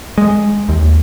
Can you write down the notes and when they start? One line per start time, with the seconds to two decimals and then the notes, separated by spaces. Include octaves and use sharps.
0.18 G#3
0.69 D#2